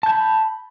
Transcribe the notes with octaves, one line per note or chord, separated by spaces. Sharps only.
A5 B5 G6